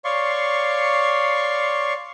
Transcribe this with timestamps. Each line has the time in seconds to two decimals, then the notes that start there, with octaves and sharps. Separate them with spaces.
0.05 C#5 D5 F5 C6 C#6